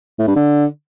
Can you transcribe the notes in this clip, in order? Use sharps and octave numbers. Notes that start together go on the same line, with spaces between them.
A2
G2
D3